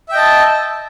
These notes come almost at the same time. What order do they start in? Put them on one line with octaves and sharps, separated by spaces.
E5 G5 D#5 A5